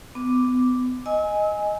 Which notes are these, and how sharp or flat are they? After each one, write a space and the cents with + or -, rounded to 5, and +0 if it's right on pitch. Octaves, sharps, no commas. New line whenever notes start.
B3 +35 D6 +0
D#5 +0 G#5 +0 E6 -30